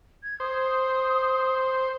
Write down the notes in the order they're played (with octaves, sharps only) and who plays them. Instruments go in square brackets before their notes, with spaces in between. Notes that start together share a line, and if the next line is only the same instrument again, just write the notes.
[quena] G#6
[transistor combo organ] C5 [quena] D#6